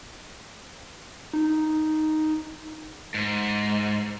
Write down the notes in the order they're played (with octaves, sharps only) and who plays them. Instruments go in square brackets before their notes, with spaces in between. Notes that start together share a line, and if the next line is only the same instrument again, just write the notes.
[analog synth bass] D#4
[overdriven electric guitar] G#2